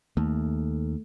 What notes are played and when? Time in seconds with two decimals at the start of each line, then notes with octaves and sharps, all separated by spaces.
0.17 D#2 A3